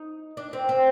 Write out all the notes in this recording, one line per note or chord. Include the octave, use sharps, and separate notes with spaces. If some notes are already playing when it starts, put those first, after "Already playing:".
Already playing: D#4
D4
C4
C4